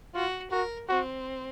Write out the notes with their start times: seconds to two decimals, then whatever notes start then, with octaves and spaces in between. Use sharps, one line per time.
0.14 F4 F#4
0.51 F#4 A#4
0.89 C4 F#4